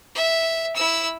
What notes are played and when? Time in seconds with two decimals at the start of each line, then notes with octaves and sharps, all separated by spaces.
0.15 E5
0.75 E4 E6